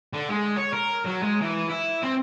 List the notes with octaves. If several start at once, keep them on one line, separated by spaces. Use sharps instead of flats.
D3
G#3
C#5
A#4
F#3
G#3
E3
E4
C4